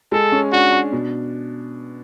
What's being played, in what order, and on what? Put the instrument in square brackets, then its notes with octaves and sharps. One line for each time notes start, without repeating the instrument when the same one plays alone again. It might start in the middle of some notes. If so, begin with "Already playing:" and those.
[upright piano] G#3 [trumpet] A4
[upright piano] C#4
[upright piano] D4 [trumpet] F#4
[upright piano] D4
B2